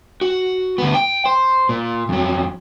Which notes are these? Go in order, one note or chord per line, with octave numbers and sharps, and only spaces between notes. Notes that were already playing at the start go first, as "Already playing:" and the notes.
F#4
D2 B3
G5
C5
A#2
F2 F#3